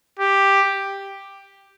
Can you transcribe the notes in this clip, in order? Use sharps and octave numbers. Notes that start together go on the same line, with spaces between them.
G4